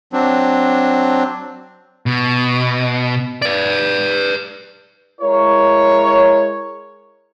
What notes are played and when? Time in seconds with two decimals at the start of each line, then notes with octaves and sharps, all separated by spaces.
0.13 F#3 C4 D4
2.06 B2
3.42 B4 D5
5.22 G#3 E4 A#4 C#5